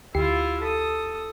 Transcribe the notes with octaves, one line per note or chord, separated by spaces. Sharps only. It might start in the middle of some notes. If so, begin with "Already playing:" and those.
D2 E4 F4 G4 C7
A4 D#6